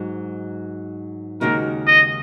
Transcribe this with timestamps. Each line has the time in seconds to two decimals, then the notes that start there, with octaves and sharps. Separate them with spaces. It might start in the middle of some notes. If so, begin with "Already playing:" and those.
Already playing: G#2 F#3 D#4
1.41 D#2 C#3 G#3 D#4 F#4 A#4
1.87 D#5